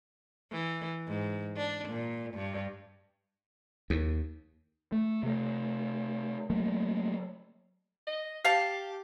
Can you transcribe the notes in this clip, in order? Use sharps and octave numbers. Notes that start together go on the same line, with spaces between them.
E3
G#2
D4
A#2
G2
D#2
A3
C3 A3
F#3 A3 A#3
D#5
G4 F5 A5